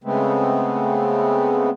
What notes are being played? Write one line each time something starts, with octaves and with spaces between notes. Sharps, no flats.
C#3 G#3 A3 B3 C4